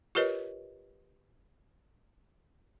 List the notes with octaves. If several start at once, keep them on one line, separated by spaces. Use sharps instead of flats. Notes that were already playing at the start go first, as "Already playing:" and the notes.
F4 G4 A#4 B4 C#5 D#5